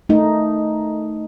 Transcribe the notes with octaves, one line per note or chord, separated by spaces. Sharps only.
A3 D#4